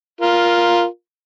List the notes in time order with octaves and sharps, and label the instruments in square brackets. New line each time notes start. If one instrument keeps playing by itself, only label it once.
[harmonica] F4 A#4